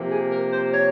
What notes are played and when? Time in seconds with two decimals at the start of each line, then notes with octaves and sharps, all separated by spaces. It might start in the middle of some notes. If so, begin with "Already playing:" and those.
Already playing: C3 F3 A#3
0.10 G#4
0.31 A#4
0.52 C5
0.74 C#5